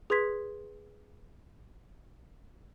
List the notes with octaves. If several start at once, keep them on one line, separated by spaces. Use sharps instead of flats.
G#4 B4 C6 G#6 B6